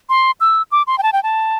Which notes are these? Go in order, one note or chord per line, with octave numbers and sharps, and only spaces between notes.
C6
E6
D6
C6
G5
A5
G5
A5